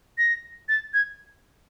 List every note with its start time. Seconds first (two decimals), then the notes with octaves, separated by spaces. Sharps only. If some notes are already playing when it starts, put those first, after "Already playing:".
0.18 A#6
0.69 A6
0.94 G#6